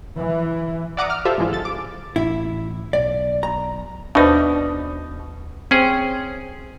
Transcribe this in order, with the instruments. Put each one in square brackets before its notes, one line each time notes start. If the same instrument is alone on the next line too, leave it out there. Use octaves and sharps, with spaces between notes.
[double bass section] E3
[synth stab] D5 E5 F#5 A#5 D6 D#6
F6
F4 G4 A4 C5 E5 F5
G#2 E3 F3 G#3 E4 F4
G1 A4 A6
D6
[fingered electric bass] A1 [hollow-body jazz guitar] E4
[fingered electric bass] B1 [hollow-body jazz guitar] D5
[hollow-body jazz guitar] A#5
[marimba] D#2 B4 C5 [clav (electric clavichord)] B2 D#4 [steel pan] D4
[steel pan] C4 [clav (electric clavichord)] C#4 G#4